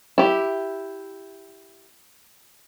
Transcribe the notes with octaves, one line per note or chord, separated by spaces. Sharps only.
E4 G4